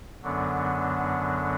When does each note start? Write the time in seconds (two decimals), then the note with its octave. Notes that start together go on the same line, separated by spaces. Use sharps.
0.22 F#2 D3 F#3 B3 D4